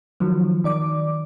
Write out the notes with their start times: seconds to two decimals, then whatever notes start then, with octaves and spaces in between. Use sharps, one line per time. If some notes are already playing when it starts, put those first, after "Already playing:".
0.20 D#3 F3 F#3
0.64 D#3 D5 D6